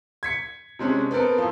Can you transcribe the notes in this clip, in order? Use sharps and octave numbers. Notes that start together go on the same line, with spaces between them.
G#6 B6 C#7
C3 G#3 C#4 D4
B3 C4 A4 A#4
F3 E4